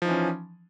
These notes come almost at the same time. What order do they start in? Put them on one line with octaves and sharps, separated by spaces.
F3 D#4 E3 C#4